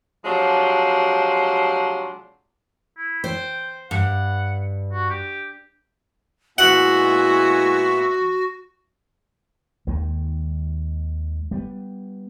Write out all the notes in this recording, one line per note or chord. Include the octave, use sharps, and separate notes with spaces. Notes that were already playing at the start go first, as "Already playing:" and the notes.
C3 F3 F#3 G#3 D4 C6
E4
C5 G5
G2 F#5
F#4
G4
A#2 G#3 B3 E4 F#4 E5 F#5 G#5
D#2 D#3 G#3
G3 G#3 B3